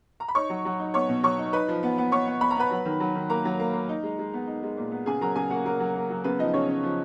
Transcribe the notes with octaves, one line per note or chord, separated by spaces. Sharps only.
A#5
B5
D#4 C#5 C#6
F#3
F#3
D#4
B3 C#5 C#6
B2
F#3 C#5 C#6
D#4
D#4 B4 B5
F3
B3
B3
B3 C#5 C#6
B3
B3 B5
A#5
B3 B4 B5
F#3
D#3
F#3
D#3
A#3 A#4 A#5
F#3
A#3
A#3
D#4
G#3
G#3
B3
D#4
G#3
A#2
B3
C#3 G#4 G#5
F#3 A#4 A#5
C#3 G#4 G#5
A#3 F#4 F#5
F#3 A#3 A#4
F#3
A#3
F#3
C#3 B3 B4
F3 D#4 D#5
C#3 C#4 C#5
C#4
F3